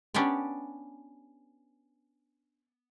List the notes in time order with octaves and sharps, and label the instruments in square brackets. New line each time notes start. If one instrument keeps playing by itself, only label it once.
[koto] B3 C#4 D4 G4 D5